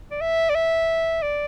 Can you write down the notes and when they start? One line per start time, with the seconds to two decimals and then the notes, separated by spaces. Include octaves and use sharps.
0.11 D5
0.21 E5
0.50 D5
0.55 E5
1.22 D5